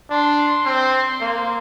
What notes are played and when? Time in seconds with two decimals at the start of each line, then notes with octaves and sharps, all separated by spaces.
0.10 D4 C6
0.65 C4
1.21 A#3